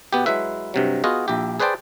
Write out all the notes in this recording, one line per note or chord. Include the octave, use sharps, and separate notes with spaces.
B2 B3 G4
F#3 G#3 E4 B4 E5
G2 C3 F#3
B3 F4 F#4 G#4 D#5
A#1 E4 G4
G#4 B4 C5 D5 G5 A5